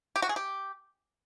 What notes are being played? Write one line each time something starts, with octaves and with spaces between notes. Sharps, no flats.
G4
F#4
G#4
G4